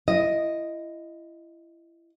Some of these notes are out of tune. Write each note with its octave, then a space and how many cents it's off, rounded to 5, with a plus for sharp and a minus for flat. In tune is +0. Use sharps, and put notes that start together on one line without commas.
E4 +30 D#5 +0